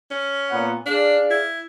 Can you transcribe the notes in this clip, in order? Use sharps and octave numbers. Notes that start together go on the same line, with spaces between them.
C#4
A#2 B3 F#5
D4 G#4 D5 F5
E4